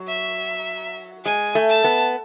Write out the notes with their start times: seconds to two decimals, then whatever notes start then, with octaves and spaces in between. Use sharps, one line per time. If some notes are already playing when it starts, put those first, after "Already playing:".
Already playing: F#3
0.08 E5
1.25 G#3 G#5
1.55 A3
1.69 A5
1.84 B3